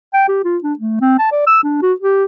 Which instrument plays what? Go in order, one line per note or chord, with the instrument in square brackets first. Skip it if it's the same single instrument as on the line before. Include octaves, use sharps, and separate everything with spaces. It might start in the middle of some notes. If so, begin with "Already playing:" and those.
[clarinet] G5
G4
F4
D4
A3
C4
A5
D5
E6
D4
F#4
G4